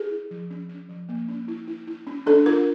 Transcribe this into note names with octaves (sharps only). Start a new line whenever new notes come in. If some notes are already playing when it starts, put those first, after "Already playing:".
Already playing: G#4
E4
F3
C#4
C#4
F3
A#3
C#4
E4
E4
E4
C#4
D4 A4
F4 A#4